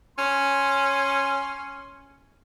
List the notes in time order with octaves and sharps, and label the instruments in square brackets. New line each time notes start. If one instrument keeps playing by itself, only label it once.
[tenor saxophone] C#4 [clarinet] C6